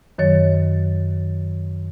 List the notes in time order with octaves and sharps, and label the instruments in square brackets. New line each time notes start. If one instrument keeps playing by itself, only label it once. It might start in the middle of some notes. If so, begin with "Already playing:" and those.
[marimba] F#2 D#3 F#3 C#5 A6